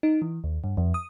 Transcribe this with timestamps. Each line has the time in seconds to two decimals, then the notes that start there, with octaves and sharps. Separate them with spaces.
0.03 D#4
0.22 E3
0.44 D#2
0.64 G2
0.77 F2
0.94 D#6